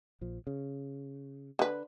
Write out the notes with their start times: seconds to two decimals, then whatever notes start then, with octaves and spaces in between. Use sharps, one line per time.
0.21 A#1 F3
0.47 C#3
1.59 D3 B4